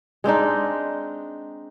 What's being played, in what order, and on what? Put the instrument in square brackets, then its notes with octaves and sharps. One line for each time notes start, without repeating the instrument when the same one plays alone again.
[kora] G#3 C4 D4 D#4